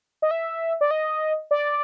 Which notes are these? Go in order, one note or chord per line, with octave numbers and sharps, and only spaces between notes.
D#5
E5
D5
D#5
D5